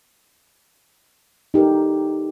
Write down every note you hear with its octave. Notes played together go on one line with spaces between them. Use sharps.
D#4 G4 A4 A#4